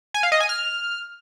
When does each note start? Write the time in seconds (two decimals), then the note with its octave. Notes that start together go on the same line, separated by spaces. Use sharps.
0.14 G#5
0.23 F5
0.32 D#5
0.40 G#5
0.49 F6